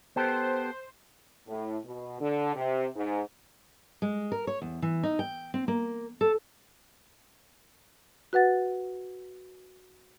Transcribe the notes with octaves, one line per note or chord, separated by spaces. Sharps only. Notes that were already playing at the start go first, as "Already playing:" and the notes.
B3 G4 A4 C5
A2
B2
D3
C3
G#2
G#3
A#4
C#5
E2
E3
D#4
G5
C4
A#3
A4
F#4 B4 F#5 A6